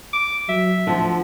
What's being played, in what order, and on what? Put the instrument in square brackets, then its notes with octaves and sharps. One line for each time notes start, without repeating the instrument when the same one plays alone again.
[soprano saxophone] D6
[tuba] F#3 [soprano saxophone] E5
[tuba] D2 [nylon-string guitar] D3 F3